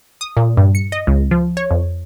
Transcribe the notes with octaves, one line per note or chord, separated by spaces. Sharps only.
D#6
A#2
G2
C#7
D#5
C#2
F3
C#5
F2